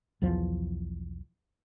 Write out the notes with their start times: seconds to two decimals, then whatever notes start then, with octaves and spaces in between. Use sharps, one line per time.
0.22 B1 E2 F3